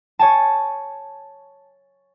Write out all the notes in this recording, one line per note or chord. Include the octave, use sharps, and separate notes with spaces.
C#5 G#5 A5